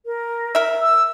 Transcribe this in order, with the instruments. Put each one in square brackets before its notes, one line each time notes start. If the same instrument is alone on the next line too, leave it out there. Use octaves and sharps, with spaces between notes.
[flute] A#4
[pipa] A#4 E5
[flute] E6